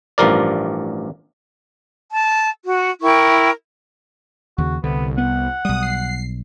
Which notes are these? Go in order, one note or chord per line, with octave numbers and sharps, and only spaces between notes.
A1 G2 F3 A#4 D5
A5
F#4
E4 A#4 G5 C#6
D#2 C#3 F#4
C2 D3 B3
B3 F#5
B1 G3 D#6
C7